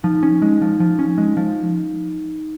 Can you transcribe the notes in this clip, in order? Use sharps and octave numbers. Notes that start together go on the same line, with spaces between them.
F3 D#4
C#4
G#3
F3
F3
C#4
G#3
F3